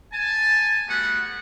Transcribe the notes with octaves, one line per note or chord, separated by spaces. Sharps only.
G#5 A5
G3 A3 B3 F#4 F#5